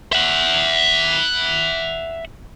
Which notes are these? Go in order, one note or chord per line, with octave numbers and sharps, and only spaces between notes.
E5 F#5